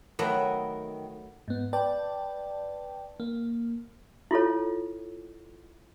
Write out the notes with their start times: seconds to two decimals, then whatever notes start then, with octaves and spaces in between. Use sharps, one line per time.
0.19 D#3 F#3 A3 B3 A#4
1.48 G#2 B3
1.73 B4 D5 G5 A5
3.20 A#3
4.31 E4 F4 A4 C#5